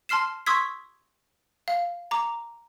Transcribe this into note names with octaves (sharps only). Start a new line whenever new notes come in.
A5 C6 F6 C7 E7
C6 C#6 D#6 E6 G#6 B6
F5
A#5 D6